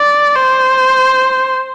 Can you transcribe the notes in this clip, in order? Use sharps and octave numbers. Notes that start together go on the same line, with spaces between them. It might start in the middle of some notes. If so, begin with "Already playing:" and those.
Already playing: D5
C5